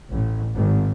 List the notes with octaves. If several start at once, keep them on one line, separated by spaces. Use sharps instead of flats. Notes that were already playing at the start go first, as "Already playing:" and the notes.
A1
G#1